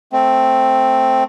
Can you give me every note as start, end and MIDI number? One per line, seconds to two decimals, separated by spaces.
0.13 1.24 57
0.13 1.24 60